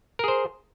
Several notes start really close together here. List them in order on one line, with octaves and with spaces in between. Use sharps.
A#4 G#4 C5